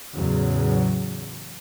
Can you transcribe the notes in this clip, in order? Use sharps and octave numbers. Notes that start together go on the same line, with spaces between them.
E2 A2 C#3 F#3